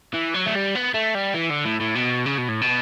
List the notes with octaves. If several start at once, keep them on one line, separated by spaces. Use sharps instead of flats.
E3
F#3
A3
G3
B3
A3
G3
E3
D3
A2
A2
B2
C#3
B2
A2
B2